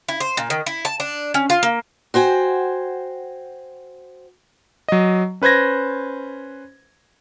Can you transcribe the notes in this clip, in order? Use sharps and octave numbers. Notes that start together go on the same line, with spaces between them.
E4
C5
A#2
D#3
E4
A5
D4
C#4
F4
A#3
F#4 C5 G5 G#5
F#3 D#5
C#4 B4 C5 G#6 A#6